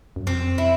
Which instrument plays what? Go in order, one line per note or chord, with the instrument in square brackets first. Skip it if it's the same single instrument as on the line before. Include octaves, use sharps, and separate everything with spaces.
[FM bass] F#2
[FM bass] F2 [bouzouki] C4
[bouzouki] E4